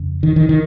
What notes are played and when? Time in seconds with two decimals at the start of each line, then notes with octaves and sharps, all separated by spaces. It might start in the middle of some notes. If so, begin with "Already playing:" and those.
Already playing: F2 C#3
0.23 D#3
0.36 D#3
0.49 D#3